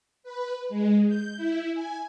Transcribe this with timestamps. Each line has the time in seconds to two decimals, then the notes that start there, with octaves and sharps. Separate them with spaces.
0.23 B4
0.69 G#3
1.07 G6
1.36 E4
1.74 G#5